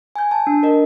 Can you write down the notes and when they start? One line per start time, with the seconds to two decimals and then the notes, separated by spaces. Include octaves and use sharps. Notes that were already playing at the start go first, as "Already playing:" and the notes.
0.16 G#5 G6
0.31 A5
0.47 D4
0.63 A#4 D#5